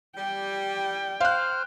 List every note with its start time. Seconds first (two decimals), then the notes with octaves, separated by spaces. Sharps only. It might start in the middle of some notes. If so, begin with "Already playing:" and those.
0.16 G3 G5
1.20 C5 F5 F6 F#6